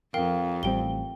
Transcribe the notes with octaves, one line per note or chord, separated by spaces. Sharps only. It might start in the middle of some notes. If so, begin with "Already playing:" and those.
F2 A#4 F5 G5
A1 G3 C4 G5 G7